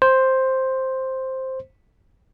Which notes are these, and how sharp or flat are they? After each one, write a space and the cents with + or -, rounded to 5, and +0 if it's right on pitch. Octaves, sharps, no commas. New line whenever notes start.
C5 +5